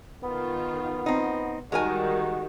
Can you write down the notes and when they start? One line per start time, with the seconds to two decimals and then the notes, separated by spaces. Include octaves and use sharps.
0.24 D#3 B3 F4
1.06 C4 D#4
1.72 D#3 G3 G#3 F#4 A#4 G#5